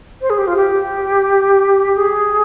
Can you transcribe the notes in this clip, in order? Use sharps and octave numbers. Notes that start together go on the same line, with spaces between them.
C5
G#4
G4
F4
G4
G#4